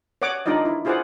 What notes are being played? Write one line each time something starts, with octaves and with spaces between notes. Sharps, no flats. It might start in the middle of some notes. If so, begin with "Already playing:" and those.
C#5 D5 F#5 D6 D#6
D4 D#4 F4 D5 D#5
E4
E4 F4 G#4 C5 D5 F#5